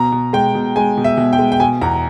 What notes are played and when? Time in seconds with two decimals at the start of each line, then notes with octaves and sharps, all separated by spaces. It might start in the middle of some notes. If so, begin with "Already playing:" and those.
Already playing: B2 A#5
0.12 B2
0.33 G#3 G5
0.55 B2
0.76 G#3 G#5
0.97 B2
1.04 E5
1.17 B2
1.33 G5
1.38 G#3
1.52 G5
1.60 B2 G#5
1.81 E2 A#5